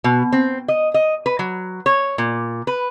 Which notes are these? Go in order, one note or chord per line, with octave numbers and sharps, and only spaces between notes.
B2
C4
D#5
D#5
B4
F#3
C#5
A#2
B4